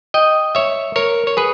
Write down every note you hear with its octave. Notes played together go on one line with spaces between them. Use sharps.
D#5 G5
C#5 E5
A#4 C#5
C#5
G#4 B4